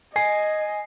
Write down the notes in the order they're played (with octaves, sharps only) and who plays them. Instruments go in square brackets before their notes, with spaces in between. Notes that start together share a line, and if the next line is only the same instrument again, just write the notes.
[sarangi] D#5 [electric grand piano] G#5 C7